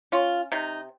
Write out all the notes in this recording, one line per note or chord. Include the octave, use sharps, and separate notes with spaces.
C#4 F4
C3 D#4